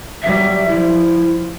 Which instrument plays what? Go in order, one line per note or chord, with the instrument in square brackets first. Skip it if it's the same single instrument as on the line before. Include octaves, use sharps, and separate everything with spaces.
[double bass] F#3 G3 [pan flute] E5
[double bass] F3 [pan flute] E4